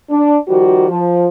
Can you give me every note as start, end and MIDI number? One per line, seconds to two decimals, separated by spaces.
0.10 0.36 62
0.47 0.86 51
0.47 0.86 53
0.47 0.86 55
0.47 0.86 66
0.88 1.25 53